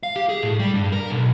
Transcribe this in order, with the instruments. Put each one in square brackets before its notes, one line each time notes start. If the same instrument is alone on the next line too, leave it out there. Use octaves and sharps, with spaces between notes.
[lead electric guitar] F5
G4
G#4
A2
G3
G2
A#4
B1